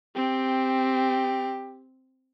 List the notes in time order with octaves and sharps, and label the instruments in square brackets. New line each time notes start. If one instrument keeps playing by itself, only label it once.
[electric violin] C4 [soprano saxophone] G4